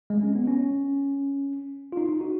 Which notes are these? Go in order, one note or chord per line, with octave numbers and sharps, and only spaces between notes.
G#3
C#4
B3
C#4
F4
D#4
D#4
F#4